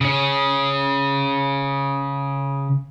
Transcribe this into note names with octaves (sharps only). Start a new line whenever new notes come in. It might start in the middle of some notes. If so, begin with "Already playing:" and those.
C#3 C#4